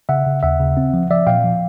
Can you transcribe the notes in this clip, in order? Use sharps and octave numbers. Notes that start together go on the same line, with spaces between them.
C#3 E5 F#5
C#3
D#2 E5 F#5
C#3
C4
F3
F3 D5 E5
A#2 F5 G5
F3